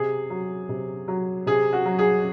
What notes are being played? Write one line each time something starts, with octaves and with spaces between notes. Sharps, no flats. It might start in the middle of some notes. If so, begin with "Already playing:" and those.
Already playing: C3 G#4
F#3
C3
F#3
C3 G#4
F#4
F#3
G#4